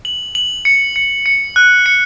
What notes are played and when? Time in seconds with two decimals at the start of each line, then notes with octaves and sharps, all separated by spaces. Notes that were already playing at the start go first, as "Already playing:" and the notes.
0.05 F#7
0.35 F#7
0.65 C#7
0.96 C#7
1.26 C#7
1.56 F#6
1.86 C#7